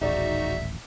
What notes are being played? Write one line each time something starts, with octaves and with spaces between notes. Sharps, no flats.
D#1 A1 D#4 F#4 G#4 D5 E5